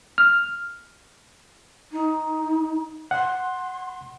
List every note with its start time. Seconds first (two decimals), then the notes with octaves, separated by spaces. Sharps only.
0.18 F6
1.91 D#4
3.11 F#5 C6